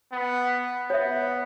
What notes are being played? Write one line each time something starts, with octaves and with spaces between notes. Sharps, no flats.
B3
B3 C#5 E5